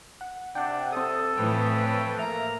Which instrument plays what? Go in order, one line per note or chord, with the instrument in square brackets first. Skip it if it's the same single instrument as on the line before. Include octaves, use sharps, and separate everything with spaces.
[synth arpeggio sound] F#5
[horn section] C3 [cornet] D4 [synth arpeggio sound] D5 F#5 G5
[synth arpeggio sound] C4 D#6 [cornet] A4
[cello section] A2 E3 F3 [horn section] B4 C#5 G5
[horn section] A#3 A#5 [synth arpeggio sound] E5